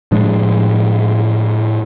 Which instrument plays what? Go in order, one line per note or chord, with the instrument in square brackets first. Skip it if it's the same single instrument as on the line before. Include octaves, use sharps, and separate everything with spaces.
[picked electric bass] A2 F3 G#3 D4